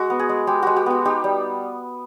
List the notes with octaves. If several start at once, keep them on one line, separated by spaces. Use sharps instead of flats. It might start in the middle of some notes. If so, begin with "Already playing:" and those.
Already playing: G#3 F#4
B3
G#4
G#3
G#3 G4
G#3 F#4
G4
B3 F#4
D#4 G4
G3